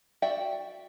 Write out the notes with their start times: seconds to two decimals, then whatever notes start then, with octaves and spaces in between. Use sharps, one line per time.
0.22 F#4 D5 E5 F#5 G5